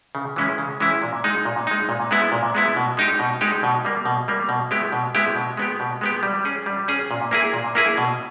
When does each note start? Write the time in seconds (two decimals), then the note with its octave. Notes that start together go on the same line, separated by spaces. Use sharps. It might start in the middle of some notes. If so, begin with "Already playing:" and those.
0.15 C#3
0.36 E3 G#3 C#4 E4
0.58 C#3
0.80 E3 G#3 C#4 E4
1.02 A#2
1.24 G#3 D#4
1.45 A#2
1.67 G#3 D#4
1.89 A#2
2.11 G#3 B3 E4
2.32 A#2
2.55 G#3 B3 E4
2.76 B2
2.97 G#3 D#4 G4
3.19 B2
3.41 G#3 D#4 G4
3.63 B2
3.85 G3 A#3
4.06 B2
4.28 G3 A#3
4.49 B2
4.71 G#3 B3 E4 G4
4.92 B2
5.15 G#3 B3 E4 G4
5.36 B2
5.57 G#3 B3 G4
5.80 B2
6.01 G#3 B3 G4
6.23 G3
6.45 C#4 G#4
6.66 G3
6.88 C#4 G#4
7.11 A#2
7.31 A#3 E4 G#4
7.53 A#2
7.75 A#3 E4 G#4
7.97 B2